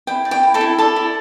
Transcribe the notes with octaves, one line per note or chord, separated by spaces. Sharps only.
E4 G5
D5
G5
E4
A4 A5
E4
A4 D5 A5
E4